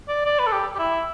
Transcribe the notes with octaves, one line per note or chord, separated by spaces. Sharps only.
D5
D5
B4
A4
G4
G4
E4